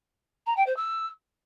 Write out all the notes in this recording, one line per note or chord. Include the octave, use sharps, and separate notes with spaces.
A#5
G5
C5
E6